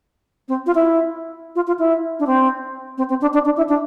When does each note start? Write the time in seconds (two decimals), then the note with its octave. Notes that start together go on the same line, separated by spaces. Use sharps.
0.48 C4
0.66 F4
0.75 E4
1.55 F4
1.67 F4
1.79 E4
2.19 D4
2.26 C4
2.98 C4
3.09 C4
3.21 D4
3.33 D4
3.45 D4
3.57 E4
3.68 D4